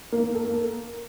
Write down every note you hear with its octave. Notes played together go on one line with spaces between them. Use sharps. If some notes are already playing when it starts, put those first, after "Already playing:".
A#3
A#3
A4
A#3